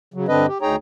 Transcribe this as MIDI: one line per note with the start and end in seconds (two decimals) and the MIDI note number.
0.14 0.27 49
0.14 0.27 54
0.28 0.46 43
0.28 0.46 50
0.28 0.46 60
0.28 0.46 62
0.28 0.46 71
0.28 0.46 75
0.48 0.58 67
0.62 0.76 38
0.62 0.76 63
0.62 0.76 68
0.62 0.76 73
0.62 0.76 79
0.62 0.76 82